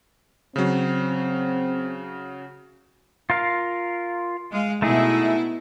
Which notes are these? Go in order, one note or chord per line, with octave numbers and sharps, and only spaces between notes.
C#3 F#3 C4
F4 A#4 F5
G#3 F5
B2 A3 D#4 E4 G#4